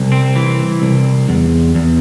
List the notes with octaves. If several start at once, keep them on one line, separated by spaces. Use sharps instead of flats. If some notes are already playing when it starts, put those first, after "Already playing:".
Already playing: C2
C4
E3
C2
E2
E2